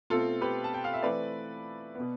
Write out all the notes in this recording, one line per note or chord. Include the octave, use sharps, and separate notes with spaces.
B2 A3 C4 F4 A4
G4 B4
A5
G5
F5
E5
E3 A3 C4 B4 D5
B2 B3